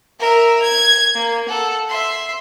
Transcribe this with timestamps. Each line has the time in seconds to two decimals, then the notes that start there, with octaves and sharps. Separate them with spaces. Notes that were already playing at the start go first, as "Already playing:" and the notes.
0.20 A#4 E5
0.62 G#6
1.15 A#3
1.48 A4 F#5
1.89 E5 C6